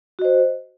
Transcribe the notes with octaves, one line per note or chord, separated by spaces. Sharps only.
F#4 C5 D#5